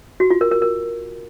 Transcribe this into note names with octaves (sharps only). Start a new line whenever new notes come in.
F#4
F4
A#4
A#4
A#4